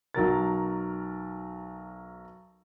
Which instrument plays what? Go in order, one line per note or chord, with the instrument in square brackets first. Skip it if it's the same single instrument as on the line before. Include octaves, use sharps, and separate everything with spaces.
[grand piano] B1 F#3 A#4 A6